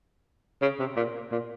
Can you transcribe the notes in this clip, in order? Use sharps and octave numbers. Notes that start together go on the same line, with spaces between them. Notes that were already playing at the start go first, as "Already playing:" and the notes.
C#3
C3
A#2
A#2